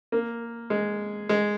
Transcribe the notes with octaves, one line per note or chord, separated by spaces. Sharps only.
A#3
G#3
G#3